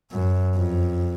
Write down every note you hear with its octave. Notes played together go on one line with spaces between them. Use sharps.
F#2
F2